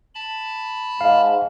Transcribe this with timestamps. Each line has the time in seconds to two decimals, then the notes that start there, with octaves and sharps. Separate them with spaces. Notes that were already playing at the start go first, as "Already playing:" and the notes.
0.15 A5 B5
1.01 G#2 F5